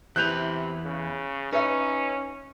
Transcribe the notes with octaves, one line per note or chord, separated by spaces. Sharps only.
E2 C3 E4 B4 F#6 G6 F7
C#3
C#4 D#4 B4 E5